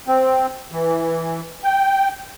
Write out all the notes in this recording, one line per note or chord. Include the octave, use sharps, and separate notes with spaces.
C4
E3
G5